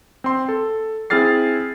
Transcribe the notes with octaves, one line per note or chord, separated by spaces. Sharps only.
C4 C6
A4
C4 E4 G#4 F6 A6 C7